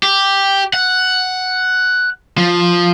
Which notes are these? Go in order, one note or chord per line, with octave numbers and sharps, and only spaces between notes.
G4
F#5
F3